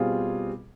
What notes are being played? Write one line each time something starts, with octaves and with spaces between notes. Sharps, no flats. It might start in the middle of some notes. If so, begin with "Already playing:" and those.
Already playing: B2 G3 C4 F4 G#4